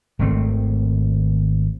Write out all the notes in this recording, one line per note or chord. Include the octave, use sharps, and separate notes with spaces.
G#1 D#3 A3 C4